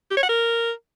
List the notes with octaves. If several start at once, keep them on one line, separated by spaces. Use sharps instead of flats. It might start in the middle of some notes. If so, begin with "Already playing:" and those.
G4
C#5
F#5
A#4